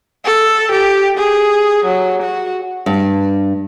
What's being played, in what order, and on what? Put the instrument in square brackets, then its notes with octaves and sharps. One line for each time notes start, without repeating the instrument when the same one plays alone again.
[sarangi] A4
G4
G#4
F#3
F#4
[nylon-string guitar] G2